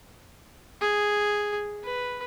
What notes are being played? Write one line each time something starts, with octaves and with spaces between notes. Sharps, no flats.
G#4
B4